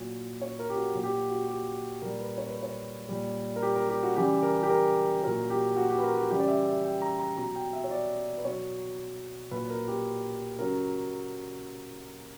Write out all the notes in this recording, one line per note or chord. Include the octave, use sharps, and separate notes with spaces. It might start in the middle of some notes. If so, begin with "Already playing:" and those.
Already playing: A#2 F#3
C#5
A#4
G4
F#4
A#2 F#3
G4
F#4
F#4
G4
A#2 G3 A#4
B4
C#5
B4
C#5
A#2 G3
A#4
G4
A#4
G4
F#4
C#3 E3 G3 G4
A#4
G4
A#4
A#2 F#3 A#4
G4
F#4
G4
B4
A#4
G4
C#3 E3 G3 G4
D5
E5
E5
G5
A#5
A#5
B2 F#3 A#5
G5
E5
C#5
D5
B4
B2 F#3 C#5
A#2 F#3 B4
A#4
G4
C#3 F#3 A#4